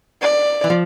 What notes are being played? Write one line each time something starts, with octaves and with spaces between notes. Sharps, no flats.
D5
E3
F3